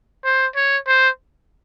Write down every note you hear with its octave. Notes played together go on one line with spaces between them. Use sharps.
C5
C#5
C5